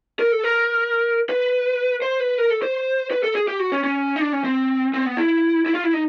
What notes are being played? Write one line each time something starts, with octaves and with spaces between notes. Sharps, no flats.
A#4
A4
A#4
B4
C5
B4
A#4
A4
C5
B4
A4
G#4
G4
F#4
C#4
C#4
D#4
D4
C#4
C4
C4
B3
E4
E4
F4
E4
D#4